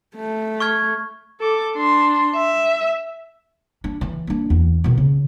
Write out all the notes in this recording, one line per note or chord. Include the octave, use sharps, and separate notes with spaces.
A3
C#6 F6 G#6
A4 D6
D4 C6
E5
D4
E3
A#3 D4
E2
B2 D#3
C#3